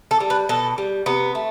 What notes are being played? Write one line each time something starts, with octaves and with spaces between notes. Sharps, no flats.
A4
G3
B4
B2 A4
G3
C3 B3
A3